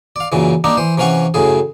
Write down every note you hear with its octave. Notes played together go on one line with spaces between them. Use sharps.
D5 F5
F#2 A#2 C#3 E3
G3 A#3 D4 D#4
E3 C5
C3 E3 C#4 F5 F#5 C#6
F#2 A2 C#3 G#4